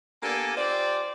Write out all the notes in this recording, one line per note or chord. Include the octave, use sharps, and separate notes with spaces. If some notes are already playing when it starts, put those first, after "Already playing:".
A#3 B3 D4 G4 A4 G#5
F4 G4 C5 D5